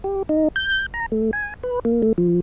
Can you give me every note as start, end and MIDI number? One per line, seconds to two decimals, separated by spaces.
0.04 0.23 67
0.29 0.48 63
0.56 0.86 91
0.94 1.06 82
1.12 1.31 57
1.33 1.54 80
1.63 1.79 71
1.85 2.02 58
2.02 2.13 57
2.18 2.40 53